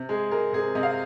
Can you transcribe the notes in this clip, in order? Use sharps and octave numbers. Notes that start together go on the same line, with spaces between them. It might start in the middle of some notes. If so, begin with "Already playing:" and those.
Already playing: C3
G#3 G#4
G#3 A#4
C3 G#4
C3 D#5
F5